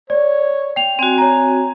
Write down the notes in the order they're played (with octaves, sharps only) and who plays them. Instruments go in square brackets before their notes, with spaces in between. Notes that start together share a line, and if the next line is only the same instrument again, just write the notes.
[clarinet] C#5 [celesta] D5
[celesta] G5 F7
[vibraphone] C4 F#4 [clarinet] G#5
[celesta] C#5 A#5